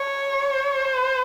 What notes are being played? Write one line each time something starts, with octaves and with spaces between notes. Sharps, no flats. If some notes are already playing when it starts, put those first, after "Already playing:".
Already playing: C#5
C5